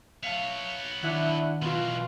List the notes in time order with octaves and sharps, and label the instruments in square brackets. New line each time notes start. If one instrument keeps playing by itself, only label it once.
[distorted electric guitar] B3 C#5 [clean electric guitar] E5 F5 A5
[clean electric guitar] D#3 [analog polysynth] D4 E4 F#5
[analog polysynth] B2 [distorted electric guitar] E3 F#3 [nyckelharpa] F4